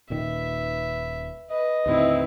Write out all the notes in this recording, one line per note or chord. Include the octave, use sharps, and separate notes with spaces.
D#1 A#2 D#3 B4 E5
B4 D#5
D#2 A2 D3 C4 D#4 E4 B4